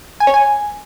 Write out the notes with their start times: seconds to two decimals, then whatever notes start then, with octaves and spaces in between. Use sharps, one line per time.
0.20 G#5
0.27 C#5
0.34 G#5